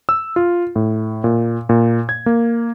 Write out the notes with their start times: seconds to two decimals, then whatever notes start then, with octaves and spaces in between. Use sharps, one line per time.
0.09 E6
0.36 F4
0.76 A2
1.24 A#2
1.69 A#2
2.09 G#6
2.26 A#3